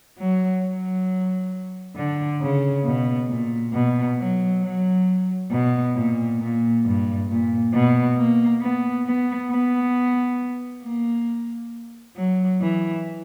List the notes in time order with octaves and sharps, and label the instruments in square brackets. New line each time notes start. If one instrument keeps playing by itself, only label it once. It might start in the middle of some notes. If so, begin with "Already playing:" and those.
[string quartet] F#3
F#3
D3
C#3
B2
A#2
B2
F#3
F#3
B2
A#2
A#2
G2
A#2
B2
A#3
B3
B3
B3
A#3
F#3
E3